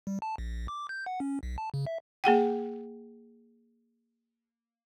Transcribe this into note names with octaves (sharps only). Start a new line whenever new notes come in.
G3
A5
A#1
D6
G6
F#5
C#4
B1
A5
C#3
E5
A#3 G#4 F#5 G5